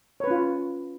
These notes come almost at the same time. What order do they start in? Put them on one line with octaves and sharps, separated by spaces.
C#5 B4 C#4 F4